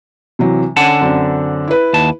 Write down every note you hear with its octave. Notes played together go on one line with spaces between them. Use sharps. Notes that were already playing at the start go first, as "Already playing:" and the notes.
C3 E3 F#3
D3 C#4 F#5 A5
F#2 C4 D4
E4 B4
D#2 A5